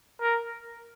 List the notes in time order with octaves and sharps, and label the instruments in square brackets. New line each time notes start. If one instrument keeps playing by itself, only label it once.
[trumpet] A#4